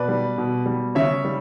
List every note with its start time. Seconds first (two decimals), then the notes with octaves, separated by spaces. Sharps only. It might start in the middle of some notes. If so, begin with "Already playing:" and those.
Already playing: B2 B4 D5
0.08 G3
0.38 B2
0.66 G3
0.95 C#3 C#5 E5
1.25 G3